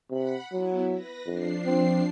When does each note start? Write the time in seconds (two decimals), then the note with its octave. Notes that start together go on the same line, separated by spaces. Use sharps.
0.10 C3 F#5 B5
0.52 F#3 B3 E4
0.89 B4 A#6
1.26 F2 F3 D4 C7
1.65 C4